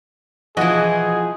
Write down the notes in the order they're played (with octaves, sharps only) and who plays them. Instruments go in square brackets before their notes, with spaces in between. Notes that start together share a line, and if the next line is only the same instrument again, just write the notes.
[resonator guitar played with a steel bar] B2 E3 [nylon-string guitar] F3 F4 [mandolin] F#4 D#5 [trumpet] G#4